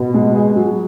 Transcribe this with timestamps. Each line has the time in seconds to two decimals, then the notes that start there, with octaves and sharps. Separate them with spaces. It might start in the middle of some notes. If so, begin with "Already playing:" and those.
Already playing: B2
0.14 G#3
0.35 G#4
0.56 F#3